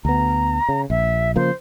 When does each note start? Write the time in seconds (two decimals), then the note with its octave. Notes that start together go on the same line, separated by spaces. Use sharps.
0.05 D2 B3 A#5
0.69 C#3
0.90 A#1 E5
1.36 C#3 F3 A#3 C5